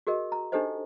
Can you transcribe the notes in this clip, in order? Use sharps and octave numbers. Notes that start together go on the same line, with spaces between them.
F#4 G#4 A#4 D#5
A#5
D4 D#4 G4 A4 C5 D#5